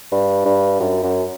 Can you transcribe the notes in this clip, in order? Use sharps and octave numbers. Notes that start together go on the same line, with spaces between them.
G2
G2
F#2
F#2